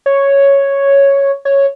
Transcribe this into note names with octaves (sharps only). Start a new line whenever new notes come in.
C#5
C#5